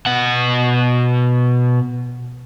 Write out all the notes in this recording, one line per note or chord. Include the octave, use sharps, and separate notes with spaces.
B2 F#5